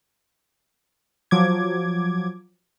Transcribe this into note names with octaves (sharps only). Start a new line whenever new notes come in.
F3 F#3 D6 G#6